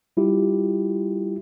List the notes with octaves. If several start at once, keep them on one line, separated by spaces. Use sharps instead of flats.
G3 E4 F4 G4